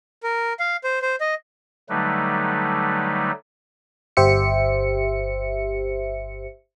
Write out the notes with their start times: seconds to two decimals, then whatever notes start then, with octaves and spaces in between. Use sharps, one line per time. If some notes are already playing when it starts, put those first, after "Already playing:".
0.23 A#4
0.59 F5
0.84 C5
1.02 C5
1.21 D#5
1.89 D3 F#3 G3 A3 D#4 B4
4.17 G1 G4 C5 E5 C#7